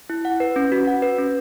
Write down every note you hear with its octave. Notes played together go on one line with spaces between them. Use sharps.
E4
F#5
B4
C#4
F#4
F#5
B4
C#4